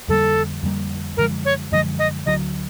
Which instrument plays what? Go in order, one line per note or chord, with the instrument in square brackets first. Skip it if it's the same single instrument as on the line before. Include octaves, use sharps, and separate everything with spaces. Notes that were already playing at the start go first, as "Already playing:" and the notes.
[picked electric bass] F2 D3 G3 A#3 [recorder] A4
[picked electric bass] F2 D3 G3 A#3
[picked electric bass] F#2 D3 F3 G#3 [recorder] A#4
[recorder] C#5
[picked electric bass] F#2 D3 F3 G#3 [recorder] D#5
[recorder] D#5
[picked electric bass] D2 D3 F#3 [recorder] D#5